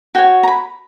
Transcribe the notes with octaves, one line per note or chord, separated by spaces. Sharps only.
F#4 C#5 G5
A#5
B5